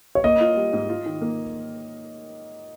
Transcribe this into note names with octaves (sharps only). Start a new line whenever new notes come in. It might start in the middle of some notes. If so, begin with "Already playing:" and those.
C#5
A#3 D#5
F4
G3
G#2
F4
D#3
A#3